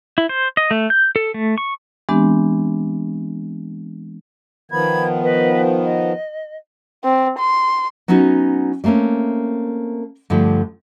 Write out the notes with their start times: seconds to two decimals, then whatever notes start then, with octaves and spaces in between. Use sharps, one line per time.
0.18 E4
0.29 C5
0.57 D#5
0.71 A3
0.90 G6
1.16 A4
1.34 A3
1.58 C#6
2.09 E3 G#3 B3 C4 D4 G4
4.72 D#3 F3 B3 B5 G#6
5.21 B4 D#5
5.83 D#5
7.04 C4
7.39 C6
8.08 F#3 B3 C#4 D#4 F#4
8.84 G3 A3 A#3 C4 C#4
10.30 G2 D3 F3 A3